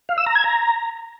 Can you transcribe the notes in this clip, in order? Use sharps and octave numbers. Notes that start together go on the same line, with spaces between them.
F5
E6
A#5
G#6
A#5